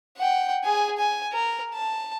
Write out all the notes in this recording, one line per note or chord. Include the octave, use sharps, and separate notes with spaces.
F#5 G5
G#4 G#5
G#5
A#4
A5